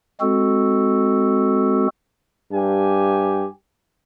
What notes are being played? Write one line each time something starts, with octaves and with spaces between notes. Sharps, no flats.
G#3 C4 F#4 A4
G2 G4 G#5